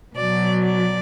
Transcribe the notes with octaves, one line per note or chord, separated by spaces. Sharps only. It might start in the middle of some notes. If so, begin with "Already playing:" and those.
B2 F#3 D5
D5